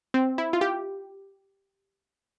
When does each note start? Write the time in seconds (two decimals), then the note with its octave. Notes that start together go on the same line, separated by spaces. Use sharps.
0.14 C4
0.38 E4
0.53 F4
0.61 G4